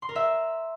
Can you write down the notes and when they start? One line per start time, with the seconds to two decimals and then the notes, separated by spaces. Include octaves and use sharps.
0.02 C6
0.09 A#4
0.15 E5